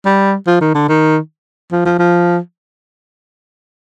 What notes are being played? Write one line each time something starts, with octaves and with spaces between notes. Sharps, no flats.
G3
F3
D#3
D3
D#3
F3
F3
F3